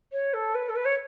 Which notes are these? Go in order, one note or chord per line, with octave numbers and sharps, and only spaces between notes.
C#5
A4
B4
A4
B4
C#5